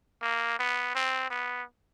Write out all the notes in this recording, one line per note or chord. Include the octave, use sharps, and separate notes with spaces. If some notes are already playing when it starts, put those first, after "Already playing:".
A#3
B3
C4
B3